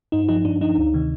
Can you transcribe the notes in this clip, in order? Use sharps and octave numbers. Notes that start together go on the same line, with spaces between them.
G2 D#4
F3 D#4
G2 D4
F3 D#4
D2
C3 D#3